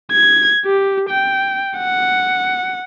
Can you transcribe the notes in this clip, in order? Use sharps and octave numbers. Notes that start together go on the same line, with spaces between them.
G#6
G4
G5
F#5